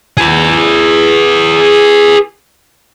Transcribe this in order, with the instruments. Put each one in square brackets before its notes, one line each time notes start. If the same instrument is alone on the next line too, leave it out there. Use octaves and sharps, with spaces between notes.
[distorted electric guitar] G#4 B4